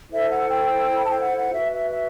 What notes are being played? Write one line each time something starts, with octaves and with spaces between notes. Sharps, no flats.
E4 A4 C5 E5
F#5
G5
B5
A5
G5
F#5
F#5
F#4 B4 E5
E5
E5